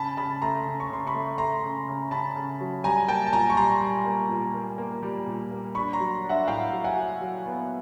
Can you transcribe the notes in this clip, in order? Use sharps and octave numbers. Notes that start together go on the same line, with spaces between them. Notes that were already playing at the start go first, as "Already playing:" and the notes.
Already playing: C#3 A5 B5
C#3 A5 B5
A3 A#5 C6
C#3
C#6
C#3 C6
B5 C#6
A3
A3 A#5 C6
C#3
C#3
C#3 A5 B5
C#3
F#3
G3 G#5 A#5
A#3 G5 A5
A5
A#2 G#5 A#5
C#6
G3 A#5 C6
G3
A#3
A#2
A#3
A#3
G3
A#2
A#3
D4 B5 C#6
A#5 C6
F#3
D4
E5 F#5
A2 F5 G5
F#3
F#5 G#5
F#3
F#3
B3